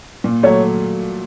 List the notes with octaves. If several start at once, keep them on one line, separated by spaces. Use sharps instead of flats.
A#2
F#3 A3 C#5